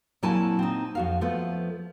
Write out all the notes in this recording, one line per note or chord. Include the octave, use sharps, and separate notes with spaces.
A#2 F#3 C4 E4 G#5 A5
C4 D#4
F2 F#4 F5
F3 A3 B3